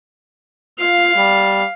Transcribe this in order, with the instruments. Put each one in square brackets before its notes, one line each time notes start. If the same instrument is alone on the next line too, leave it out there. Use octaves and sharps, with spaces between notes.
[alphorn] F4 [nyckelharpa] F5
[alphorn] G3